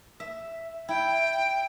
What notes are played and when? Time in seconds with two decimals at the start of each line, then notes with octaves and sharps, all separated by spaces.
0.20 E5
0.89 E4 G5